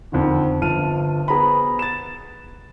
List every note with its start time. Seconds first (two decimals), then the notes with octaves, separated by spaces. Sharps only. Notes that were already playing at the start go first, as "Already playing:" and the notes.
0.12 F2 D3 D#3
0.61 G1 F3 A5 F6 D#7
1.28 B3 G#4 C5 A#5 B5
1.79 A6 E7